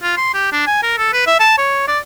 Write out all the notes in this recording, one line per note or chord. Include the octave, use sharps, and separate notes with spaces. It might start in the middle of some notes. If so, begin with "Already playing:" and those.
F4
C6
G4
D4
G#5
A#4
A4
B4
E5
A5
C#5
D5